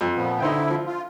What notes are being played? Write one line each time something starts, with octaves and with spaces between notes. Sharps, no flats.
F2
A#2 F3 B3
D3 D#4 E4 C5 G5
F3
F4